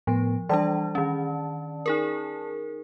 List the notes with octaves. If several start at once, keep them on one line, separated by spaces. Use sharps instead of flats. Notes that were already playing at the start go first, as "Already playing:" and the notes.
A2 F3 B3
E3 G3 D4 D5 A5
D#3 C#4
D#4 G#4 A#4